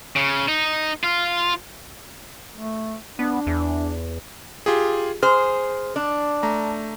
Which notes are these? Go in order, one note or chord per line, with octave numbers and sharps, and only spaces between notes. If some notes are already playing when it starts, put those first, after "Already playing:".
C#3
D#4
F4
A3
B3 D4
E2
F4 G4 G#4
G#4 C5 F6
D4
A3 A#5